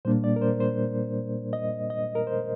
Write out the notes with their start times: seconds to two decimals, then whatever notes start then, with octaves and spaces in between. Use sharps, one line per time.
0.05 A#2 G3 A#3 D4 C5
0.24 D5
0.36 A#4
0.42 C5
0.60 C5
1.53 D#5
1.90 D#5
2.15 A#4
2.27 C5